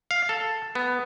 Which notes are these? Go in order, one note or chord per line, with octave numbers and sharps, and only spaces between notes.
F5
A4
B3